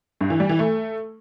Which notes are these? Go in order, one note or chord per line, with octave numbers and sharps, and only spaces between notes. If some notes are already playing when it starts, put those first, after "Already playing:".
G2
E3
G3
E3
A3